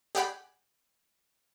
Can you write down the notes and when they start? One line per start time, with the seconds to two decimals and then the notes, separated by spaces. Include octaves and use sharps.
0.15 G4 G#4 D5 F#5 G#5 B5